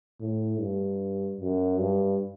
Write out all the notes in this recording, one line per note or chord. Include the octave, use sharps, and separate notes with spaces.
A2
G2
F#2
G2